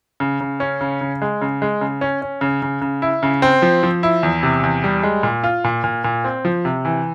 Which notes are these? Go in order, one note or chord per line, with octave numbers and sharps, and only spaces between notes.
C#3
C#3
C#4
C#3
C#3
G#3
C#3
G#3
C#3
C#4
C#4
C#3
C#3
C#3
E4
C#3
C4
F3
F3
E4
E2
C3
E2
G3
G#3
A#2
F4
A#2
A#2
A#2
C4
F3
C3
E3